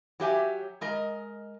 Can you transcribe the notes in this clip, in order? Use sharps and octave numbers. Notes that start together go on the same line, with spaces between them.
F#3 G4 E5 G#5
G#3 A#4 D#5